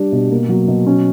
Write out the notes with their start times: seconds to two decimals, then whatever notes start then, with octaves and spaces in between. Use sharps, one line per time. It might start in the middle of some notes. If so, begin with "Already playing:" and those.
Already playing: G3 D4
0.12 B2
0.31 A#3
0.49 F#3
0.68 B2
0.86 C#4